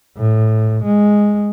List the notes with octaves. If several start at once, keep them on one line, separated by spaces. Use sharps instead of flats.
A2
G#3